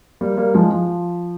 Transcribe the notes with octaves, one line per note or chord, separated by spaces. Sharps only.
G3 A#3
G3 A#3
F3 G#3
F3